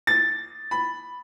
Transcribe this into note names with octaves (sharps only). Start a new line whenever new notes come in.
A6
B5